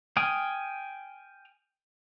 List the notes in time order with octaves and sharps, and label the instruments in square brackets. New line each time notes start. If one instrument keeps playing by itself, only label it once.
[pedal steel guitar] G5 G#5 D#6 F6